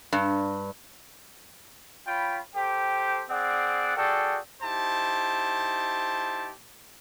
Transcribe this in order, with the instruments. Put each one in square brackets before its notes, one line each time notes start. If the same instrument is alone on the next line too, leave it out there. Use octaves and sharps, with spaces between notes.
[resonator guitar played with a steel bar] G2
[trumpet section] F4 C#5 G5 B5
G4 A4 C5 G5
C4 G#4 D5 F#5
F#4 G#4 A4 D5 G5
D#4 E4 G4 C5 A5